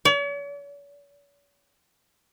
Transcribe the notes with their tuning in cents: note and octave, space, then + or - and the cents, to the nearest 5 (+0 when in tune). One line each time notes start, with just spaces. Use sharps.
C#5 +45